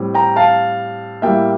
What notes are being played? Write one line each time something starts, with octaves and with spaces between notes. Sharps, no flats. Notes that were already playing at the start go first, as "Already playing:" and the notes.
Already playing: A2 G3 C4
G5 A#5
F5 A5
A2 G3 A#3 E5 G5